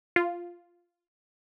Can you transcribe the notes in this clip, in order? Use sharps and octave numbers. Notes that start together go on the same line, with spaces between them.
F4